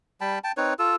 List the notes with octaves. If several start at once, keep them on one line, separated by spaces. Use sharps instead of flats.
G3 G5 A5 B5
G5 A5
C4 D#4 B4 C#5
F4 A4 E6